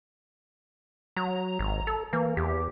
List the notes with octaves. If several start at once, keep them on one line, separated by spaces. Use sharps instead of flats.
F#3 A#5
G#1
A4
E3 A#3
E2 G4